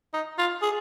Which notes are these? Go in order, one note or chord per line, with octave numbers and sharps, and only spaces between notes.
D#4
F4
G#4